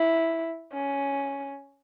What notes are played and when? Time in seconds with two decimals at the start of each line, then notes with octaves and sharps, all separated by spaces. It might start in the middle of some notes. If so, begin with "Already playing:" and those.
Already playing: E4
0.73 C#4